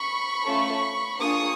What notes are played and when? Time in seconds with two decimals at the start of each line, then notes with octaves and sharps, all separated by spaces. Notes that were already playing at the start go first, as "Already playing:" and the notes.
Already playing: B5 C#6
0.46 A3 C#4 F4 A4
1.20 A#3 D4 F4 G#4 C#6 D#6